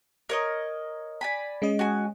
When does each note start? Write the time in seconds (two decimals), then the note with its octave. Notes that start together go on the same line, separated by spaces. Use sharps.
0.29 A#4 C#5 D#5
1.21 D5 G#5 B5
1.62 G#3 C#4 D#5
1.79 F#4 G#5